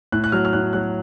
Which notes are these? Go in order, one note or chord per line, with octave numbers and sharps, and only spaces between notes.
A2 F#6
F#6
F#3 F6
F6
A2 F#6
F#3 F#6